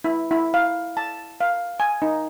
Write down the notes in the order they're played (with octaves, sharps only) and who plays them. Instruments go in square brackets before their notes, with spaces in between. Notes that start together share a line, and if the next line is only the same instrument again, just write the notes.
[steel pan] E4
E4
F5
A5
F5
G#5
D#4